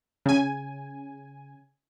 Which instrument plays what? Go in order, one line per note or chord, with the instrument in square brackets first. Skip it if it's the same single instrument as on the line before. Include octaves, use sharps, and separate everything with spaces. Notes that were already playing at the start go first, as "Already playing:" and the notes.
[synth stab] C#3 G#5